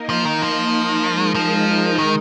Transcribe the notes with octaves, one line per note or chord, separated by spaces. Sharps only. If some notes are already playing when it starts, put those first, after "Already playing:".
Already playing: A#3 D#4 A#4 D#5
F3
D#3
F3
G#3 D#4 A#4 D#5
F3
D#3